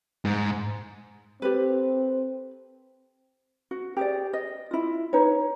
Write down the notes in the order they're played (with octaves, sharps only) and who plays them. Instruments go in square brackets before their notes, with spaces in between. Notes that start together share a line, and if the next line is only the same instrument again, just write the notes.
[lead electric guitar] G#2
[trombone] C4 [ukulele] G4 A4 B4
[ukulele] F#4
G4 G#4 D5
D#5
E4 F4
D#4 B4 C#5